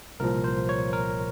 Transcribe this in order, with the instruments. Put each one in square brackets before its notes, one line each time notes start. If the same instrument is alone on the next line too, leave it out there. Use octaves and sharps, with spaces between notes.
[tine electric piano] C2 A#2 F3 A#4
C5
C#5
A#4